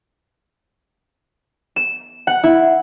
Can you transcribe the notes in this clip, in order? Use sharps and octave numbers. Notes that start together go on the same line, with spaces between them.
E7
F#5
E4